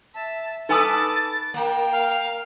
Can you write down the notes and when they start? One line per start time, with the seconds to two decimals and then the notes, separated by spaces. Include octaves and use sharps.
0.14 E5 A5
0.69 D#4 A4 B4 G#5 A5 D6 D#6 A6
1.54 A#3 A#4 G5
1.92 F5